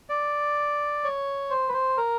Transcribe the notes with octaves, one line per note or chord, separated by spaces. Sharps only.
D5
C#5
C5
B4
C5
A#4